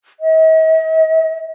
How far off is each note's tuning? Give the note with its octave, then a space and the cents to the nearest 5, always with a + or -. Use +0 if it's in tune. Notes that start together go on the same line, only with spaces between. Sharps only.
D#5 +45